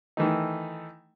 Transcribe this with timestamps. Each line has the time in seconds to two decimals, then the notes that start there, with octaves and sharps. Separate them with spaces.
0.17 D#3 E3 A3 D#4